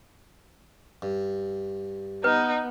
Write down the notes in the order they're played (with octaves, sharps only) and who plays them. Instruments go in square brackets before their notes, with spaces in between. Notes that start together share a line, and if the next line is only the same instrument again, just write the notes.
[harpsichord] G2
[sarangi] B3 [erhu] D#4 [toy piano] B4